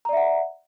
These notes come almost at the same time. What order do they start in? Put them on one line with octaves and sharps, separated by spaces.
A#5 D5 E5 F#5